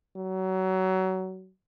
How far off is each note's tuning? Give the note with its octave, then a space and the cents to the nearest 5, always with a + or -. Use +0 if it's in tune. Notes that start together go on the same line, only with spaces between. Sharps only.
F#3 +25